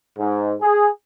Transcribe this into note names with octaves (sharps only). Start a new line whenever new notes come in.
G#2
G#4